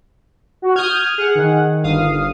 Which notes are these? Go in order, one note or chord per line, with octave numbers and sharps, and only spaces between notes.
F#4
D#6 F6 G6 G#6
G#4 F#5
D#3
G1 F5 D#6